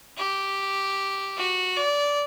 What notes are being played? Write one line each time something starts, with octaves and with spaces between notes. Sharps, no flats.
G4
F#4
D5